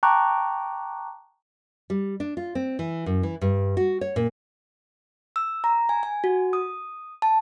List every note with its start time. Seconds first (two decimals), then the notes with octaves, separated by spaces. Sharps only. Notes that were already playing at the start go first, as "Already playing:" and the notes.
0.03 G5 A5 A#5 C#6 D6 F#6
1.90 G3
2.20 D4
2.37 F4
2.55 C4
2.79 E3
3.06 F#2
3.23 E3
3.41 G2
3.77 F#4
4.01 C#5
4.16 A#2
5.36 E6
5.64 A#5
5.89 G#5
6.03 G#5
6.24 F#4
6.53 D#6
7.22 A5